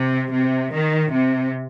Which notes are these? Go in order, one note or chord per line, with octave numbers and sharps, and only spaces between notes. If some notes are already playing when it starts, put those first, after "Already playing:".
Already playing: C3
C3
D#3
C3